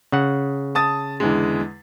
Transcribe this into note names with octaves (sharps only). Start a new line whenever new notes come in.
C#3 F#5
A5 D#6 A6
E2 D3 G#3